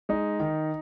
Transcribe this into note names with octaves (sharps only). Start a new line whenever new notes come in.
G#3 D#4
D#3